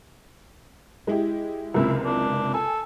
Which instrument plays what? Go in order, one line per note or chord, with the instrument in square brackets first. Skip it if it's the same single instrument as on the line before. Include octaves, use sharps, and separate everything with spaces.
[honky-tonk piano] G#3 E4 G4
[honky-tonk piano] F#1 C#2 C3 [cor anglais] E4
[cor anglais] D4
[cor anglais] A4 [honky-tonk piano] G#5